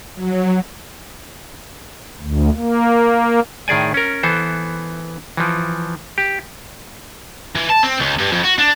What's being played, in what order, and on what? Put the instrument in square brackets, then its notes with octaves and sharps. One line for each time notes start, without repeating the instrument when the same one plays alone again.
[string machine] F#3
[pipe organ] D2
A#3
[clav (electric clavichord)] A2 D#3 G#4 D5 G#5
C#4 A#4
E3 B3 A4 C5
E3 F3
G4
[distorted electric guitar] E3
A5
C4
C#2
G2
F2
F#4
D4